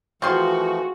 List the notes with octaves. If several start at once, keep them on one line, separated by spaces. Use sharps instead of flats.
E3 F3 A3 C4 F4 F#4 G#4 C6